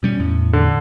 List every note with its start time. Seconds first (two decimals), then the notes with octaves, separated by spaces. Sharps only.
0.03 B2 G3 C#4
0.19 E2 A2
0.53 D3